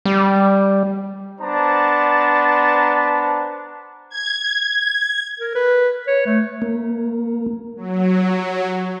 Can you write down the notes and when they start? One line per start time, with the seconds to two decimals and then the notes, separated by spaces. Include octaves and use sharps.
0.06 G3
1.40 B3 D4 C5 A5 A#5
4.09 G#6
5.40 A#4
5.55 B4
6.07 C#5
6.26 A3
6.62 A#3
7.77 F#3